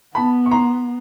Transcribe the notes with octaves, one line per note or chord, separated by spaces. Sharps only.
B3 A5 B5
C#6
A#5 C6